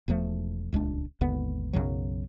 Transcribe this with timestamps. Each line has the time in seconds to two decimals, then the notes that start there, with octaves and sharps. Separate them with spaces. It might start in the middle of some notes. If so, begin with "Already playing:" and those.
0.08 E1 E2 F3 A3
0.73 D#1 C#2 G#3 D4
1.21 G#1 D#2 D3 B3
1.73 B1 F#2 C#3 F#3